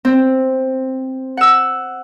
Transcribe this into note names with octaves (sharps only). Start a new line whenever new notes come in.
C4
F#5 E6